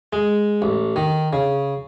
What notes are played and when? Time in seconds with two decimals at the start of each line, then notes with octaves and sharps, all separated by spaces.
0.13 G#3
0.62 A1
0.96 D#3
1.33 C#3